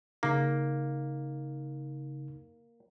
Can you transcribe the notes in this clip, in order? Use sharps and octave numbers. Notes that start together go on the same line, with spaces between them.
C#3 A#3 D#4